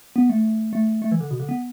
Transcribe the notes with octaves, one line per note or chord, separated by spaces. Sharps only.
B3
A3
A3
A3
E3
D3
B2
D3
B3